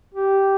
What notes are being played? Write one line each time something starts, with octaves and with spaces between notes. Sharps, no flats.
G4